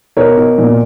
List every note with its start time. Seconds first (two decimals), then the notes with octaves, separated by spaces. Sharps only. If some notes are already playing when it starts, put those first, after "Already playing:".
0.17 B2 A#4 C#5
0.37 B2
0.58 A#2